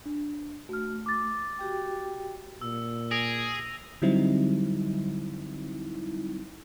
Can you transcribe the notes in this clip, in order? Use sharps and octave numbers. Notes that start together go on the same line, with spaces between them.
D4
A3 F#4 F6
D6 A6
F#4 G4 G5
A#2 E6
G#4 A#6 D7 F7
D3 F#3 G3 C4 D#4 E4